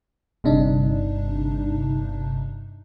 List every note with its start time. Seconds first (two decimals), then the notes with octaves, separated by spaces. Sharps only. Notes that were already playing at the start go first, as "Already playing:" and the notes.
0.44 G1 G2 C3 D4 D#4